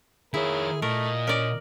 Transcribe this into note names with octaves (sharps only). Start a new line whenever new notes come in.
D#3 E4 G#4 A#4 C#5
A#2 A3 A#4 D#5
C#4 A#4 D5